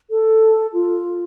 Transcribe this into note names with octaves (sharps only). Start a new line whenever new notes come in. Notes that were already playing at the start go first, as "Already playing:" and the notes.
A4
F4